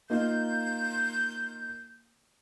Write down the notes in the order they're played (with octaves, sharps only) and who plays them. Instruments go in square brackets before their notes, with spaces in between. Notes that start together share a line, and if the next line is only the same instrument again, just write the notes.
[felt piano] A#3 D#4 F4 [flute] G6